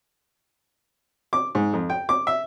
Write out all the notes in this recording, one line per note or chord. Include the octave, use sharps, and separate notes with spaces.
D6
G#2
F2
G5
D6
E5